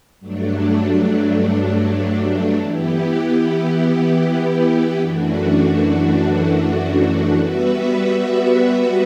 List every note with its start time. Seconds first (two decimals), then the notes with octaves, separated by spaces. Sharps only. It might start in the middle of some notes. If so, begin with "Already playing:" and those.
0.20 G2 F#3 A3 D4
2.60 E3 B3 E4 G4
4.99 F#2 E3 A3 D4 F#4
7.39 G3 B3 F#4 B4 E5